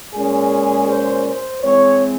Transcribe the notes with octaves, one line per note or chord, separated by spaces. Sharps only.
A#2 G#3 C#4 G#4
C5
C5
E3 G#3 C4 C#5